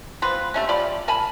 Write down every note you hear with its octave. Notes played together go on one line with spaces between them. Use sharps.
B3 C4 F4 B4
G3 A3 C#4
F4 G4 D5 B5
A#4 G#5 A5 B5